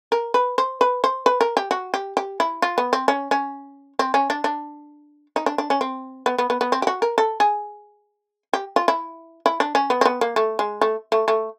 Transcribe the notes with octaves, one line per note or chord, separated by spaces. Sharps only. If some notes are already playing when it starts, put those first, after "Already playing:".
A#4
B4
C5
B4
C5
B4
A#4
G4
F#4
G4
G4
E4
F4
B3
C4
C#4
C#4
C4
C#4
D4
D4
D#4
D4
D4
C#4
C4
B3
B3
B3
B3
C4
G4
F#4
A#4
A4
G#4
G4
F4
E4
E4
D4
C#4
B3
C4
B3
A#3
A3
G#3
A3
A3
A3